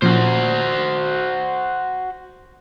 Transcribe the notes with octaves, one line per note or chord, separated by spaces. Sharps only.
A#2 F3 C#4 F#4 C5